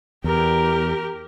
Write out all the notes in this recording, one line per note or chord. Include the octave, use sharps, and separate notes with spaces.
E2 G4 A#4